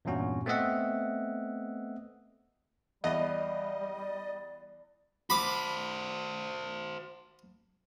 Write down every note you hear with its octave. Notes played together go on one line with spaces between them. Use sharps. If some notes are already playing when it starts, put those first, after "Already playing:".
E2 G2 A#2 C#4 F#4
A3 B3 C4 D#5 E5 F#5
E2 G3 D#5
D5
F#4 C5 B5 D6